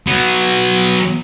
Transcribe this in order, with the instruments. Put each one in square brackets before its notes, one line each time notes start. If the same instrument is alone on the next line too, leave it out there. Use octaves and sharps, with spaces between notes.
[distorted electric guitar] F#3 B3